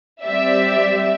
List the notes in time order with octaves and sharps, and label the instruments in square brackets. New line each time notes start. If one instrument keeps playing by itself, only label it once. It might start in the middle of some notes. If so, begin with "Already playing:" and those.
[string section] G3 C4 G4 D5 E5